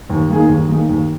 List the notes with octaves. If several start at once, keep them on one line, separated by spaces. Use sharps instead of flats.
D#2
D#3 A#3 D#4 G#4
D#2
D#3 A#3 D#4 G#4
D#2